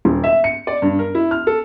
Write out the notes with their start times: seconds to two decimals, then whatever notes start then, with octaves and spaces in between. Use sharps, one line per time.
0.05 D#1
0.24 E5
0.44 C#7
0.67 D5
0.82 G2
0.99 A#4
1.15 E4
1.31 F6
1.47 A4